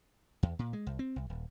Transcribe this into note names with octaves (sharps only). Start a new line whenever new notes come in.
E2
A#2
G#3
C2
C4
C2
D#1